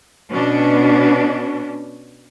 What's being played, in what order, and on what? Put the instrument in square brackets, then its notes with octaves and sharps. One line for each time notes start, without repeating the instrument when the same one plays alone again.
[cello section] B2 C#4 D4